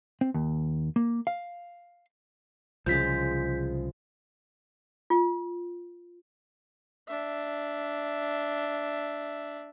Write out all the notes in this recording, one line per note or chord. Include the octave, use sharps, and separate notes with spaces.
C4
D#2
A#3
F5
C2 C#3 F3 G#3 G6 B6
F4
D4 E5